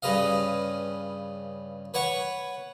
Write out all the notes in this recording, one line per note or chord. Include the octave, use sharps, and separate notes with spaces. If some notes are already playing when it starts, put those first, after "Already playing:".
G2 C#3 B4 D#5 F5
B4 C#5 F#5 C#6